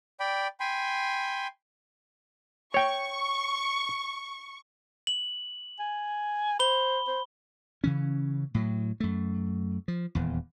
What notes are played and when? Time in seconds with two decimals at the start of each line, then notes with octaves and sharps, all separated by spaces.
0.20 D5 G5 B5
0.60 G5 G#5 B5 C6
2.74 C#5 G5 C#6
5.07 F#7
5.79 G#5
6.59 C5 B5 G7
7.07 C5
7.84 C#3 E3 C#4
8.54 A2 F#3
9.00 F#2 A3
9.88 F3
10.15 D#1 E2